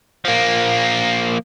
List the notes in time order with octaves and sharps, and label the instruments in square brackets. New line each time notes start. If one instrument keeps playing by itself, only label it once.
[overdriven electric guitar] F3 A#3